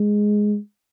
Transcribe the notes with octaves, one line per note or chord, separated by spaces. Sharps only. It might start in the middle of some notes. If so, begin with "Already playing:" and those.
Already playing: G#3